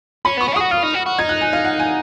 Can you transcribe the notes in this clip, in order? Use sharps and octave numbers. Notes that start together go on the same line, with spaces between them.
C#4 B5
B3 C#6
C#4
F#4 G#4 D#6
F4 F6
D#4
F#4
F#4
D#4 G#6
F#6
G#5
F5
F#5
G#5